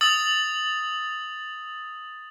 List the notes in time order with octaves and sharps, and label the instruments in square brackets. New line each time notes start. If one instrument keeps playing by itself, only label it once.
[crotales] D#6 E6 A6 F#7